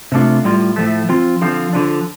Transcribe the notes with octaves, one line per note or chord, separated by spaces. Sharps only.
C3 A3 D4 F4
A2 G3 F4
A2 F3 A3
F3 C4 F4
D3 F3 C4 F4
D3 F3 D4